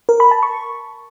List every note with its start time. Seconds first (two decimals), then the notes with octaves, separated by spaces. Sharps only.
0.09 A#4
0.20 B5
0.31 A5
0.43 C#6